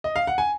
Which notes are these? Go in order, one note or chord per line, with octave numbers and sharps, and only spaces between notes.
D#5
F5
F#5
G#5